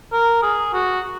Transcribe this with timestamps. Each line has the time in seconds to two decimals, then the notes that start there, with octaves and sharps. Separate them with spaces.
0.12 A#4
0.42 G#4
0.73 F#4